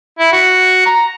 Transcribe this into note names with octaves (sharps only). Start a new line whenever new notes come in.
E4
F#4
A#5